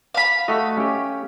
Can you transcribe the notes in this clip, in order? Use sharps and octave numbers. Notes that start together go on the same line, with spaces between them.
F5 B5
A3 F#4 D#5
C#4 G4